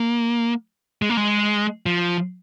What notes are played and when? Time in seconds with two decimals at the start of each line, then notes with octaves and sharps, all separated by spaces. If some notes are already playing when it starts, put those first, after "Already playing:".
Already playing: A#3
1.02 G#3
1.10 A#3
1.17 G#3
1.86 F3